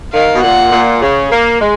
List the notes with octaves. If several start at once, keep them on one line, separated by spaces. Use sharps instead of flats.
D#3 F5
B2
A#2 F#5
A#2
C#3
A#3
G#3